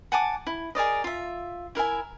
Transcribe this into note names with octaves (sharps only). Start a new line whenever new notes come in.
F#5 G#5 A5 D6
E4
G#4 A#4 D5 D#5
F4 E5
E4 A#4 E5 G#5